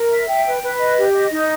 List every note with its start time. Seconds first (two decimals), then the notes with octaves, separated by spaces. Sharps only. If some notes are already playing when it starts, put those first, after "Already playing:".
Already playing: A#4
0.10 E5
0.28 G5
0.45 B4
0.62 B4
0.80 D#5
0.97 G4
1.14 D#5
1.31 D#4